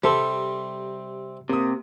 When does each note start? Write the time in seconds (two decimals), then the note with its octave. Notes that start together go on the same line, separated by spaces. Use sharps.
0.04 C3 G3 C4 A4 C6
1.49 C3 A#3 D#6